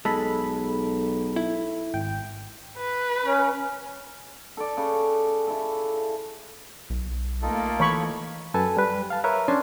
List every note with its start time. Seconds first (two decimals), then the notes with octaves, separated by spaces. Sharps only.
0.05 B1 G#3 A4 B5
1.36 E4
1.94 G#1 G5
2.77 B4
3.24 C#4
4.57 A4 D5
4.77 C#3
5.48 E4 A4
6.90 B1
7.42 A3 A#3 D#4 F4 A4
7.80 E3 C#5 B5 C#6
8.54 F#2 A4 B4 G#5 A5
8.77 G3 B4
9.10 F5 A5
9.24 A#4 B4 C#5 E5 A#5
9.48 C#4 D4 G#5 A5 C6